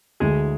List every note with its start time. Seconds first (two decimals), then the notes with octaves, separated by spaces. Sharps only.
0.20 D2 G#3 G#4